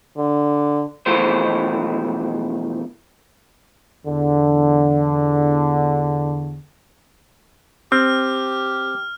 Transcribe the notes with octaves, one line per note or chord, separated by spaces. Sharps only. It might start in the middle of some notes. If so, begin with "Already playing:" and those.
D3
B1 E3 F3 A3 C5
E2 D3
C4 G4 F6